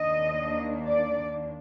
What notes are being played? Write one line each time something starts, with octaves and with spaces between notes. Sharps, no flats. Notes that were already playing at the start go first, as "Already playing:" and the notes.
Already playing: D#2 D#3 A#3 D4 D#5
D5